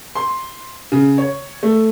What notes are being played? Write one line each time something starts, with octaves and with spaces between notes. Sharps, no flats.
C6
C#3
C#5
A3